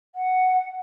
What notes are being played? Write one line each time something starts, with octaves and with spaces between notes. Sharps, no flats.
F#5